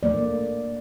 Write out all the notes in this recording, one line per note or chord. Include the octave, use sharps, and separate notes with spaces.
A3 A#3 D5